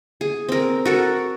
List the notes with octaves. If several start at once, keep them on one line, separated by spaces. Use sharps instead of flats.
G#4
C4 A#4
F#4 A4 A#4